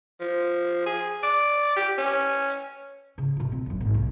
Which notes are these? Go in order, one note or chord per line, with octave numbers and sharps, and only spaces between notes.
F3
G#4
D5
G4
C#4
C#3
B2 F4
C4
B1 F#2
G#1
C2 A#2